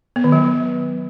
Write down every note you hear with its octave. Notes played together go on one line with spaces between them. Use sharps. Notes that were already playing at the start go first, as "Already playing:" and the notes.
B3
D#3
F#3